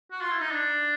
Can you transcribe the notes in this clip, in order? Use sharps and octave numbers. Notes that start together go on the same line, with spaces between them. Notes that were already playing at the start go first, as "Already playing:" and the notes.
F#4
F4
E4
D#4
D4